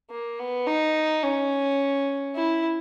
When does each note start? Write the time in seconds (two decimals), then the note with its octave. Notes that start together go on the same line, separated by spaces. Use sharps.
0.11 A#3
0.39 B3
0.67 D#4
1.23 C#4
2.35 E4